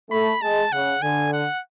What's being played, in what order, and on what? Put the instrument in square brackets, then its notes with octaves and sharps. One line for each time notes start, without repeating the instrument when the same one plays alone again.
[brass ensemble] A3 [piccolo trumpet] B5
[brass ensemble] G#3 [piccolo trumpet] A5
[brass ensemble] C#3 [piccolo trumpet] F#5
[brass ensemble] D3 [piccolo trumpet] G#5
[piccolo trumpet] F#5